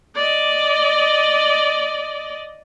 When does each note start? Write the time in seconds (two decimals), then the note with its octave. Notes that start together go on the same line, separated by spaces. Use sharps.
0.16 D5 D#5